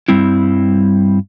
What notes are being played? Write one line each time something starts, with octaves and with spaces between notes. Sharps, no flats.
G2 G3 C4 E4